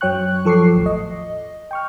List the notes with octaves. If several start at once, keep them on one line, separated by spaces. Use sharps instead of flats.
F#2 F#3 C#5 G5 C#6 F#6
F3 A4 C#6 D6 C7
G#1 D#2 A2
D#5
G5 C#6 F6